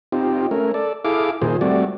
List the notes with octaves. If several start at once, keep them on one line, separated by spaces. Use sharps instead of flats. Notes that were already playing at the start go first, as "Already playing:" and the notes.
C4 D#4 F4 G4
A3 C#4 A#4
A4 D5
E4 G#4 A4 F5 D6
A#2 D#3 F4 G#4 C5
G3 A3 C4 F#4 D5